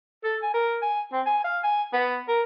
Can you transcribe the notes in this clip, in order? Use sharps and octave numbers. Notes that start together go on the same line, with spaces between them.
A4
G#5
A#4
G#5
C4
G#5
F5
G#5
B3
A#4